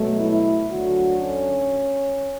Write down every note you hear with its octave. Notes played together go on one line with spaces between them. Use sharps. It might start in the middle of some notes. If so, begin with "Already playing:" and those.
Already playing: B2 F#3 A3
E4
D2 D3 F#3 A3 F#4
C#4